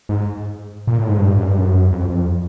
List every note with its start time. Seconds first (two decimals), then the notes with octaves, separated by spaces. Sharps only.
0.09 G#2
0.87 A#2
0.98 A2
1.08 G#2
1.18 G2
1.37 F#2
1.47 G2
1.58 F#2
1.92 F2
2.10 F2